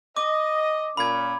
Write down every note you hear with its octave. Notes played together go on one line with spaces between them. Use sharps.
D#5 D6
A#2 C#4 B5 G#6